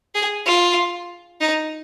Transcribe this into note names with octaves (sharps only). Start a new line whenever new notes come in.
G#4
F4
D#4